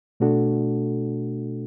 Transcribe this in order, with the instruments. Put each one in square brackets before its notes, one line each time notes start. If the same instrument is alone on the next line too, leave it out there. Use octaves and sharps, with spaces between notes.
[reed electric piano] B2 A3 D4 F#4 A4